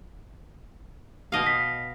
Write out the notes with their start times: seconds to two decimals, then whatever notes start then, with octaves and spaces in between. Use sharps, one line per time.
1.32 B2 D#5 F5
1.47 B6